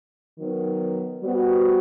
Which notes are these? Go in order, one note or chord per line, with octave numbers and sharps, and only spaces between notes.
D#3 F#3 B3
G3 B3 F#4 C5